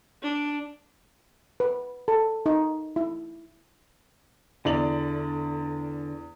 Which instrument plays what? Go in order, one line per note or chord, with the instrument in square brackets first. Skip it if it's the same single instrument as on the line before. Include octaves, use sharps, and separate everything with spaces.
[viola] D4
[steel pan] B4
A4
D#4
E4
[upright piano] E2 D5 F#7 [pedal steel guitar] D3